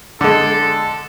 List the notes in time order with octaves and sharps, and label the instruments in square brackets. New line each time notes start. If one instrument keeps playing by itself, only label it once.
[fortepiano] D3 G#3 [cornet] A4